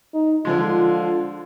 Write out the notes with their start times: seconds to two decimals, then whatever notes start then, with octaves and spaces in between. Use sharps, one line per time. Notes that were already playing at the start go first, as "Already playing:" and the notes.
0.14 D#4
0.45 D3 F3 G#3 F4